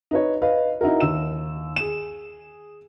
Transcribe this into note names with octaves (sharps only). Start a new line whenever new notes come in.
D#4 B4 C#5
B4 D#5 F5
D#4 E4 F#4 A#4
D#2 E6 E7
G#4 E7